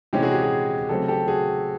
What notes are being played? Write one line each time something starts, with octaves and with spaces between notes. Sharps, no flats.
C3 E3 G#3 C#4 G4
F#4 G#4
G4
F#4 G#4
C#3 F#3 A3 C4 G4 A4
G4 A4
F#4 G#4